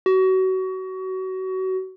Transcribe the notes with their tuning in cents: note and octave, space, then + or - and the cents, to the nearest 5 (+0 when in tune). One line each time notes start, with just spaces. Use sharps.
F#4 +25